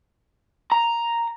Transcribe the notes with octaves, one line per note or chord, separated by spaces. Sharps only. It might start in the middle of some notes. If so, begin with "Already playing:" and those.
A#5